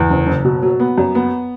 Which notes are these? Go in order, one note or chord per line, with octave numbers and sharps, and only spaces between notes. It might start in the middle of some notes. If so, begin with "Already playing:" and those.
Already playing: E2
F#1
F#1
B2
F#3
B3
F#2
B3